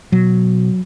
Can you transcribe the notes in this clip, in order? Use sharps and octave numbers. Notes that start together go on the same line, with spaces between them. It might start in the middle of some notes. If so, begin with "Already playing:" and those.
B2 F#3